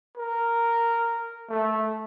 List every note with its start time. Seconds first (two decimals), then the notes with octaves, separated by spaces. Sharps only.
0.18 A#4
1.49 A3